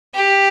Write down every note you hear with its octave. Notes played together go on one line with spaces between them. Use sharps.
G4